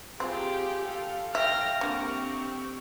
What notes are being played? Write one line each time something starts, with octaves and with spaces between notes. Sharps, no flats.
C4 F4 G4 G#4
A4 F5
E5 F5 G5 F6 A#6
D3 A#3 C4 G4 C#6